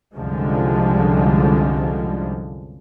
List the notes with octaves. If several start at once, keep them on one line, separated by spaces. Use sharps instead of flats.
C2 F#2 D3 F3 G3 G#3